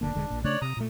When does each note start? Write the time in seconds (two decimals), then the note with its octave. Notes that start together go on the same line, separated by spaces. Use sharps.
0.01 F1 D3 A#3 D4
0.15 E1 D3 G#3
0.30 A#1 A#2
0.44 C#3 A3 D4 C#5 D5 F#6
0.62 C3 A#5 D#6
0.77 A#2 A3